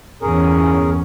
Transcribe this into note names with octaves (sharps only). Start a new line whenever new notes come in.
G1 E2 C#4 G#4 A#4